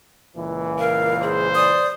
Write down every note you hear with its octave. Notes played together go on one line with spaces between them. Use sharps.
C#2 A#2 E3
A#4 F5
G#4 C5
D5 D#6